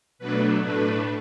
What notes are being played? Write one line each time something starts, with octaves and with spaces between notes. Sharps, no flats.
B2 F#3 A3 D4 B4
A2 A3 D4 B4